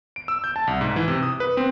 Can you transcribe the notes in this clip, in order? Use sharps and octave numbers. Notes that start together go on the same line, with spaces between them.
D7
E6
G6
A5
C2
G#2
E3
C3
D#6
B4
C4